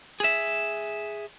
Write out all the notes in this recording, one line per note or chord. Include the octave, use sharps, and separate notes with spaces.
G#4 E5